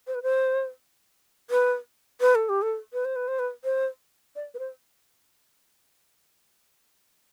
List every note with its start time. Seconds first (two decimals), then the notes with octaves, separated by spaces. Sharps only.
0.07 C5
0.15 B4
0.23 C5
1.50 B4
2.21 B4
2.35 A4
2.49 G4
2.62 A4
2.93 B4
3.05 C5
3.16 B4
3.28 C5
3.39 B4
3.64 C5
4.36 D5
4.54 B4
4.59 C5